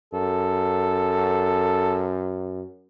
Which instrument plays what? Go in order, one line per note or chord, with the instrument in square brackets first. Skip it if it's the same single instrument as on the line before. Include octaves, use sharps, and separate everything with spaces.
[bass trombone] F#2 [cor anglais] A4